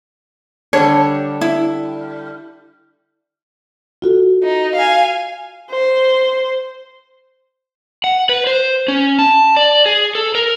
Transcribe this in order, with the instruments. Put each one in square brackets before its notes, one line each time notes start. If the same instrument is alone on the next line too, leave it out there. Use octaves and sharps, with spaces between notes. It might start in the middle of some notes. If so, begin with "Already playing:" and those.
[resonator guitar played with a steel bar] D3 G3 D4 [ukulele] C#5
[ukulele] E4
[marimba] F4 F#4 A4
[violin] D#4
F5 G#5
[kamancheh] C5
[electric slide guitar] F#5
B4
C5
C#4
A5
D5
G#4
A4
A#4